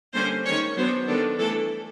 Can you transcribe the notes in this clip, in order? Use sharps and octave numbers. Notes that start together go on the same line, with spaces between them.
D3 G3 A#3 C#4 C5
D#3 G#3 C#4 C#5
F#3 B3 D4 C5
D#3 G3 B3 D4 A4
E3 A3 D4 A4